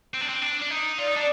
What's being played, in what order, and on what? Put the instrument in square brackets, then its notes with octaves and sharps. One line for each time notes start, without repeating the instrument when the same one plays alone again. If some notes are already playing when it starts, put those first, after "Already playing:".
[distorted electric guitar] C4
D4
C4
D4
D4
D#4
[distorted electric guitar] F4 [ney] D5
[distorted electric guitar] D#4
D4